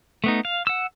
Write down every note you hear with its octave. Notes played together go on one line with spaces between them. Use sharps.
A3 B3 D#4
F5
F#5 E6